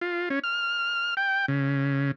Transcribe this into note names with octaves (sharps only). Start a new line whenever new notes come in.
F4
C#4
F6
G5
C#3